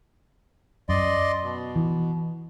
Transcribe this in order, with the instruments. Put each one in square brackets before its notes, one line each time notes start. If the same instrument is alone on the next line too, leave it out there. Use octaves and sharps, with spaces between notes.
[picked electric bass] F#2 [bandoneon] D5 D#5 C6
[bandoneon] B2
[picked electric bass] E3